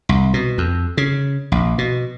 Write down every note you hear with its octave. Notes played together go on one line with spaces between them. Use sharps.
C2
B2
F2
C#3
A#1
B2